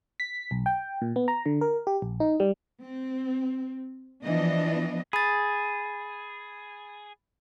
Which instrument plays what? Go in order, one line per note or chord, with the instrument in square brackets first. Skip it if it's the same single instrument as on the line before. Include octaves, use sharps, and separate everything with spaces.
[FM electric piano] B6
B1
G5
A#2
B3
A#5
D3
A#4
G4
A#1
D#4
G3
[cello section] C4
E3 F3 B3 D4 D#5
[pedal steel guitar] G#4 [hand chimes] B5 A6